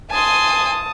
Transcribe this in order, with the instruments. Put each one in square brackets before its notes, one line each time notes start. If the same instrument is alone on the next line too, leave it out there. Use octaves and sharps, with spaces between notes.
[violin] G#5 C6 [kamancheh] A5 D#6